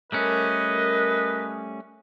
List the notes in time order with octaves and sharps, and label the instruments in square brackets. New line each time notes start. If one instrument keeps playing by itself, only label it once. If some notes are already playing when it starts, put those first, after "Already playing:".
[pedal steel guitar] G3 A3 C#4 [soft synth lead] A#4 [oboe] B4 [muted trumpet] D#5